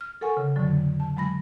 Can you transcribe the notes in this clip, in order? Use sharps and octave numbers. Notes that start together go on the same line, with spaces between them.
F6
A4 A#4 F#5 G#5 C#6
C#3
F2 A2 D3 F#3
A5
F#3 G#3 B5 A#6